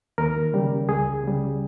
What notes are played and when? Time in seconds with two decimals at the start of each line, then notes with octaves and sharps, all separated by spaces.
0.18 D#2 A#4
0.54 C#3 G3
0.89 C#2 G#4
1.23 C#3 G3